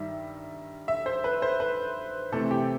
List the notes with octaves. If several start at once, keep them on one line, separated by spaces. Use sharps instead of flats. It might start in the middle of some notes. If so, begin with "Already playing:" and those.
Already playing: G2 D#3 G3 E5
E5
C5
B4
C5
B4
C3 E3 A3 C4 A4
G4